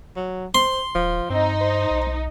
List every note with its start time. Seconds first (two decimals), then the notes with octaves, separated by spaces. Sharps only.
0.16 F#3
0.55 C5 C6
0.95 D#1 F3
1.30 G2 C4 D#4
1.61 C5
1.91 B1